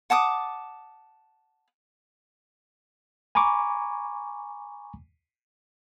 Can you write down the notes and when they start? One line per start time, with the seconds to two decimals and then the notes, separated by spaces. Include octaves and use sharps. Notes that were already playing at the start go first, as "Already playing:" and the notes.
0.10 F#5 A5 D6 D#6
3.35 G#5 A#5 B5 C#6 D6